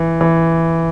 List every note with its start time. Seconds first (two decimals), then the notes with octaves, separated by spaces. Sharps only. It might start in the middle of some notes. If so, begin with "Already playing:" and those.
Already playing: E3
0.21 E3